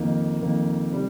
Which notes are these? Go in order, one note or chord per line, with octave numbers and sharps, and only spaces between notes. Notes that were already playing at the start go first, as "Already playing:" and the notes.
Already playing: F2 D#3 A#3
F2 D#3 A#3
C3 G3